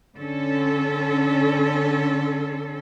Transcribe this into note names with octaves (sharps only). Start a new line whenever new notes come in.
D3 C#4 A4